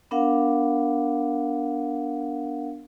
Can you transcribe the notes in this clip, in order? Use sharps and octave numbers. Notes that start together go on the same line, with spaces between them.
B3 D4 A#4 F5 F#5